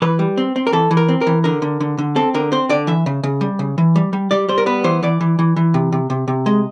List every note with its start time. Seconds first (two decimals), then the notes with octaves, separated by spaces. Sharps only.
0.02 E3 B4
0.19 G3
0.37 C4
0.56 C4
0.67 A#4
0.72 E3 A4
0.91 E3
0.97 A#4
1.08 C4
1.21 A#4
1.27 E3
1.44 D3 A#4
1.62 D3
1.80 D3
1.98 D3
2.16 C4 A4
2.35 D3 A#4
2.52 C4 C5
2.69 D3 D5
2.87 E3 E5
3.06 C#3
3.23 C#3
3.41 G3
3.59 C#3
3.78 E3
3.96 G3
4.13 G3
4.31 G3 D5
4.49 G3 C5
4.58 A#4
4.66 B3 B4
4.84 E3 C5
5.03 E3 D5
5.21 E3
5.39 E3
5.56 E3
5.74 C3
5.92 C3
6.10 C3
6.28 C3
6.46 G#3 D#5